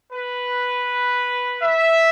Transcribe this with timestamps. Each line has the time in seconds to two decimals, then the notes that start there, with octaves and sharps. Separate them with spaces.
0.13 B4
1.62 E5